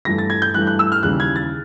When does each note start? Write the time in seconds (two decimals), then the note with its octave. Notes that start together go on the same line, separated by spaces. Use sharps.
0.05 G2 E3 A3 A#6
0.18 A6
0.30 G#6
0.42 G6
0.54 G2 E3 A3 F#6
0.67 F#6
0.79 E6
0.92 F6
1.03 D#2 C#3 E3 G3 F#6
1.20 G#6
1.36 A6